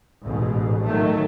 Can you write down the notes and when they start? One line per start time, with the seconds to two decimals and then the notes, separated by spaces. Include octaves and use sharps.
0.24 A1 G#2 B2
0.85 D#3 F#3 A3